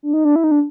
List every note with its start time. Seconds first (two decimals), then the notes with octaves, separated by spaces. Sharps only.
0.03 D4
0.13 D#4
0.25 D4
0.36 E4
0.44 D#4
0.51 D4